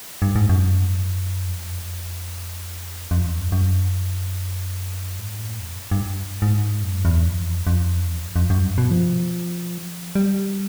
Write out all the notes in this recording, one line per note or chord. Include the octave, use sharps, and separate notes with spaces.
G2
G#2
F#2
F2
F2
E2
F#2
F#2
G#2
A2
E2
F2
G2
G#2
F#2
E2
F2
F2
E2
F2
F2
F#2
G2
B2
F3
G3